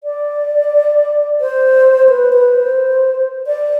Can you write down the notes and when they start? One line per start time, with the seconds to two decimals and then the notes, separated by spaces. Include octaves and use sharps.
0.04 D5
1.41 C5
2.09 B4
2.33 B4
2.56 C5
3.47 D5